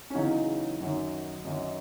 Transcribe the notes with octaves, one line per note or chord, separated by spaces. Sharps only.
C#4
E2 C#3 F#3 D#4
F#2 D#3 F#3
F#2 D#3 F#3 D#4